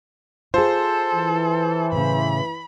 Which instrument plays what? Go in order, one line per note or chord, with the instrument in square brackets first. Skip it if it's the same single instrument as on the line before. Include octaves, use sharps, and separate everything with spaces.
[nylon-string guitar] F4 G#4 [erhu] A4 [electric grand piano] C5
[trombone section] E3
[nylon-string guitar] A2 C#3 [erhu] B5